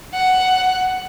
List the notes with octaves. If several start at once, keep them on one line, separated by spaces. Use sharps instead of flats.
F#5